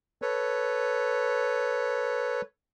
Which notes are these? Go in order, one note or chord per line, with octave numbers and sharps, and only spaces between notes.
A4 B4 C#5